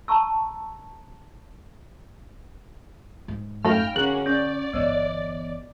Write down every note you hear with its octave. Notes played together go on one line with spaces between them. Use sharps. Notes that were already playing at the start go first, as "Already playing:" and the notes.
A5 A#5 C#6 E6
G#2
F#2 A3 D#4 F5 G5 B5 F6
D3 A#3 C#4 F#4 G#4 F#6
C#4 D5 C#6
G1 E3 B3 C#5 D#5